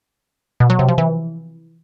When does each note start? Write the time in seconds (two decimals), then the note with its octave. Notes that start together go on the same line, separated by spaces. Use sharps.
0.60 B2
0.70 F#3
0.79 C3
0.88 F3
0.98 E3